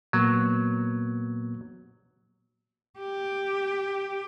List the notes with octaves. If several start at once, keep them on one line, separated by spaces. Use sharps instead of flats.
A#2 F#3 A#3 B3
G4